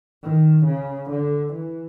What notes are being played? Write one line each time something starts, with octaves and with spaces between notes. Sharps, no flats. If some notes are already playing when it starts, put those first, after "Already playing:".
D#3
C#3
D3
E3